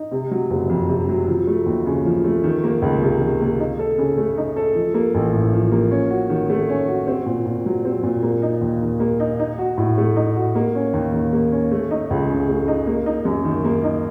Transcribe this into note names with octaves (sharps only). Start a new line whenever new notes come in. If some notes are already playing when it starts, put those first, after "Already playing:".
Already playing: D#4
C3
F#3
F#1
F2
C3
F#3
F3
A3
D#2
C#3
F3
A3
D#3
A#3
C#2
C3
D#3
A#3
D#4
A4
C#3
A3
D#4
A4
F3
A#3
A1
A2
F3
A#3
C#4
F#4
D#3
A3
C#4
F#4
C4
A#2
A#2
F#3
C4
A#2
A#3
D#4
D#2
D#3
A#3
D#4
D#4
F#4
A2
A3
D#4
F#4
A#3
C#4
D#2
D#3
A#3
C#4
A3
D#4
C#2
C#3
A3
D#4
A#3
D#4
F#2
D#3
A#3
D#4